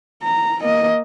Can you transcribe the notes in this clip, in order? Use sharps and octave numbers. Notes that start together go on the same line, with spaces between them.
A#5
A#3 D#5